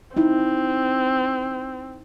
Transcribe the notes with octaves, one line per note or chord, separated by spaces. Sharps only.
C4 D#4 E4